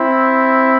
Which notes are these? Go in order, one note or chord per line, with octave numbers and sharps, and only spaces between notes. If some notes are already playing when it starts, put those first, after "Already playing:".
Already playing: C4 E4